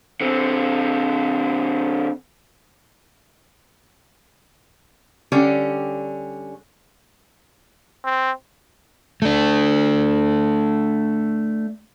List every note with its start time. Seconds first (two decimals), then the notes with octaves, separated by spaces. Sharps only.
0.21 D3 C4
5.32 D3 G3 C#4
8.05 C4
9.22 A3 D4